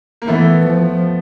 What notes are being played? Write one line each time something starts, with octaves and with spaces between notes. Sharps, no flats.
A#3
E3 A3 B3
F3